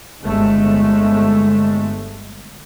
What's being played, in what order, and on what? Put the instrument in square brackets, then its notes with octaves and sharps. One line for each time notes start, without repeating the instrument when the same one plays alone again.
[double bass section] G1 G#3 A3